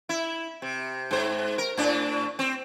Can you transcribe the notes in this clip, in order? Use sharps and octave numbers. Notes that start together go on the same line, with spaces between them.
E4
C3
G#2 C5
A#4
A2 D4
C4